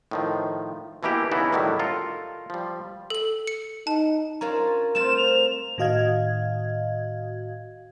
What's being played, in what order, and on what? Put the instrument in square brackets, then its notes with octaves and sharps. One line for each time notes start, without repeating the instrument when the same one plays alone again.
[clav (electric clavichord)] A2 D#3 F3
B2 E3 A#3 E4 G4
C#3 E3 B3 D#4 E4 F#4
A2 D3 D#3 F#3 G3
F4 A4 A#4
F3 G3
[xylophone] A4 F#7
C#7
[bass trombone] D#4 [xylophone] A5
[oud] C#4 D4 F4 [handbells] A#4 A#5
[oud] A3 C4 F4 [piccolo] E7
[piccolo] F7
[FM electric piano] A2 D#3 F#4 D#5 F5 G#6